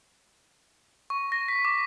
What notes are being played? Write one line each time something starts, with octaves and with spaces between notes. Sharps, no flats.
C#6
A#6
B6
D6